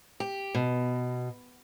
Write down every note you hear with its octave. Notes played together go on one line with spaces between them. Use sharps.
G4
B2